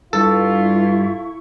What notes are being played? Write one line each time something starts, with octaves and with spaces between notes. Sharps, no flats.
G2 E4 F4 A4 C#6